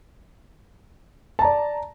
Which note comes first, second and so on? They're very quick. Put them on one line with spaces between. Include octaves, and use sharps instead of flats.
A5 A#5 D5